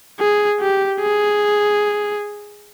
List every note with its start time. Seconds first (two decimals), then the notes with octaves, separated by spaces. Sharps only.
0.19 G#4
0.60 G4
1.00 G#4